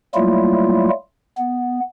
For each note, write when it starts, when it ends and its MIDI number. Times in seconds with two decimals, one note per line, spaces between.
0.15 0.89 54
0.15 0.89 55
0.15 0.89 57
0.15 0.89 58
0.15 0.89 64
0.15 0.89 65
1.38 1.80 59